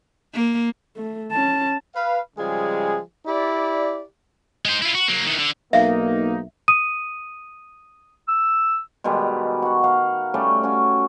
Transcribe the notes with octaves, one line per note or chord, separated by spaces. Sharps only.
A#3
A3
C#4 A5
B4 F5
C#3 F3 G3 G#3 G#4
E4 G4 D5
G#3 C5
E4 F4
F#4
F#3 A#3
D#3 E3
D3
B1 A#3 D#4 E5 F5
D#6 D#7
E6
B2 D#3 G3 G#3
F#4 F#5
A#4 F5 F#5
G3 A3 C#4 D5
C#4 F#4